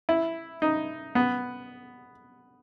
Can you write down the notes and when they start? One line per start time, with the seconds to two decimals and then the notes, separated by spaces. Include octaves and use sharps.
0.09 E4
0.62 D#4
1.15 B3